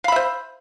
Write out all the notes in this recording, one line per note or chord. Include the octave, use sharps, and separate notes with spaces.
C5 E5 F5 B5